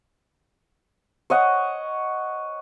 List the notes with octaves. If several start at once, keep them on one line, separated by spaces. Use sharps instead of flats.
C#5 D#5 F#5